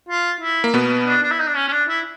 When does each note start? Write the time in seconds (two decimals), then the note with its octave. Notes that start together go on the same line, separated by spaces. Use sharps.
0.09 F4
0.41 E4
0.64 A#3
0.74 B2 B3
1.07 D4
1.23 D4
1.31 E4
1.40 D#4
1.47 D4
1.56 C#4
1.68 C#4
1.72 D4
1.89 E4